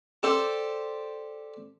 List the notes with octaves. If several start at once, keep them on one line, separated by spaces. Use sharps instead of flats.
G4 A4 C5 D5